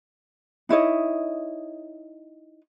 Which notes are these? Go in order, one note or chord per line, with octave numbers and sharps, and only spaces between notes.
D#4 E4 C#5 D#5